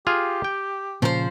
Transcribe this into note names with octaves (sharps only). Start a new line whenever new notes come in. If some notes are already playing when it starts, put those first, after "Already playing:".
F4 G4 G#4 F5
G5
A#2 C#3 F3 C5 A#5